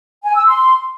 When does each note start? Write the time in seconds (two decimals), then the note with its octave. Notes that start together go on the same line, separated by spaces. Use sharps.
0.24 G#5
0.35 E6
0.46 C6